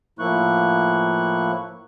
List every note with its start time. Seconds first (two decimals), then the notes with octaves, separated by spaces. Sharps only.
0.19 A2 F3 A#3 E4 C#6 F#6